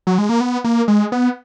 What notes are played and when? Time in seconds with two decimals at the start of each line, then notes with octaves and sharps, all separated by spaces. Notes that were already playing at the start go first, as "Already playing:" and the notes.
0.07 F#3
0.18 G#3
0.29 A#3
0.41 B3
0.64 A#3
0.88 G#3
1.12 B3